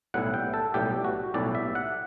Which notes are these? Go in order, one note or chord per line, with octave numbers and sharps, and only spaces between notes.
B1 A2 G3 B3 E4 F#5
G5
A4
B1 A2 G3 B3 E4 G4
F#4
B1 A2 G3 B3 E4 D5
E5
F#5